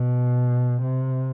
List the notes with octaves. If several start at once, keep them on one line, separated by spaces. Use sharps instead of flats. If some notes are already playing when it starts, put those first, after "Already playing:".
Already playing: B2
C3